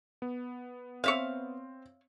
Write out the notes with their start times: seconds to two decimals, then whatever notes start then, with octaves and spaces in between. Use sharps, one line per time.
0.22 B3
1.04 C4 C#5 E5 F5